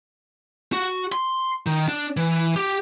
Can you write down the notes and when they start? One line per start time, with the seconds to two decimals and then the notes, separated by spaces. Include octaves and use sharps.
0.73 F#4
1.12 C6
1.66 D#3
1.88 D4
2.17 E3
2.56 G4